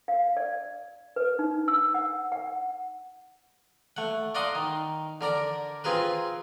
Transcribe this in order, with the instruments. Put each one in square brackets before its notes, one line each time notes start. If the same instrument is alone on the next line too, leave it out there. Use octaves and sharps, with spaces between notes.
[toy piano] F5
D5
B4
D#4
E6
F#5
F#5
[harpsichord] A3 F#5
D5 F5 F#5 A#5 C6 D#6
D#3
D3 A#4 D5 A#5
C4 F4 G#4 A#4 B4